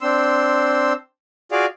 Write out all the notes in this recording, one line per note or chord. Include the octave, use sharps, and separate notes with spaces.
C4 D4 C6 E6
F4 F#4 G#4 D5 F5